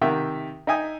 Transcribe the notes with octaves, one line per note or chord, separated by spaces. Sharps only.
C3 D#3 E5 F#5 G5
D#4 E5 G5 G#5 D#6